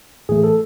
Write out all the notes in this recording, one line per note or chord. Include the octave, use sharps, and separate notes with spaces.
A2 E3 A3 G#4
A4